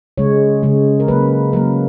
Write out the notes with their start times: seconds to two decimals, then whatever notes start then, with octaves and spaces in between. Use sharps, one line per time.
0.18 C#3 G#3 C#5
0.63 C#3 G#3
1.00 A#4
1.08 C#3 F#3 A#3 B4
1.53 C#3 F#3 A#3 A#4